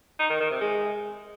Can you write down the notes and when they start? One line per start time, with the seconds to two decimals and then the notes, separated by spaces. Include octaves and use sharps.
0.19 D#4
0.30 D#3
0.40 D#3
0.50 C3
0.61 G#3